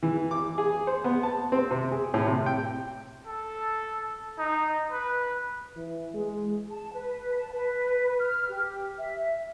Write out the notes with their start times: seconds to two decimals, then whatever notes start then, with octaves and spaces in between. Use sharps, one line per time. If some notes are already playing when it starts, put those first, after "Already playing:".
0.03 E3
0.31 D6
0.58 G#4
0.87 C5
1.04 B3
1.23 A5
1.52 C4
1.71 C3
1.92 G#4
2.14 A2
2.27 C3
2.46 G5
3.26 A4
4.38 D#4
4.91 B4
5.77 E3
6.14 G#3
6.70 A5
6.93 B4
7.37 A5
7.52 B4
8.19 F6
8.49 G4
8.98 E5